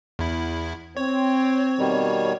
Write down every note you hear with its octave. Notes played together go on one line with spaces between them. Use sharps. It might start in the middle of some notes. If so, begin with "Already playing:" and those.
E2 E4
C4 C#5
B2 D#3 G3